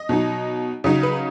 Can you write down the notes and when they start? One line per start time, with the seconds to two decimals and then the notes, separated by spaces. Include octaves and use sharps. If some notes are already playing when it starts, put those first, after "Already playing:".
Already playing: D#5
0.09 B2 F#3 D#4
0.84 C#3 F#3 D#4
1.03 B4